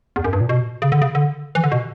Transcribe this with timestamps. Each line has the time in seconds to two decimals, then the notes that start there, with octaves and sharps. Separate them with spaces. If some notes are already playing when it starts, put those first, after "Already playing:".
0.16 E2
0.24 F#2
0.33 G2
0.41 A#2
0.49 B2
0.82 C#3
0.92 D3
1.02 C#3
1.15 D3
1.55 E3
1.64 D3
1.72 B2